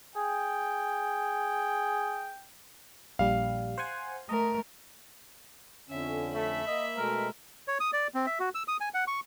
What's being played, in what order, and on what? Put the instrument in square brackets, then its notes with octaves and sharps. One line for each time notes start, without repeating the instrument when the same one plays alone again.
[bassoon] G#4 [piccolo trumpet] G5
[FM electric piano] A#1 G3 [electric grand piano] F5
[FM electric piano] C5 F#5 G#5
[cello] A3 A#4 [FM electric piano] D#5
[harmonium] F2 D3 C#4 [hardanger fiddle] E5
[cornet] A3 [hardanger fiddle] E5 B5
[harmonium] A#3 [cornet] D#5
[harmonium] B2 G#3 A3 [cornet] A#4
[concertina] C#5
D#6
D5
C4
E5
F#4
E6
D#6
G#5
F#5
C#6